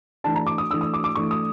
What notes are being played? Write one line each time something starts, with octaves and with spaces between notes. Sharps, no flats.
E3 A3 D4 A5
A#5
D6
D#6
E3 A3 D4 E6
D#6
D6
D6
E3 A3 D4 C#6
D#6